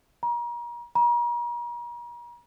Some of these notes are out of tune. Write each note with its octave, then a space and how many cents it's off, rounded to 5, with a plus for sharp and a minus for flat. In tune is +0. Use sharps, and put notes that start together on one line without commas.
A#5 +35
A#5 +40